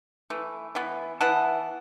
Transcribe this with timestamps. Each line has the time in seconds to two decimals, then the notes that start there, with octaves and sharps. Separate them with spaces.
0.30 E3 A3
0.75 E3 B3
1.21 E3 B3 F#5 A5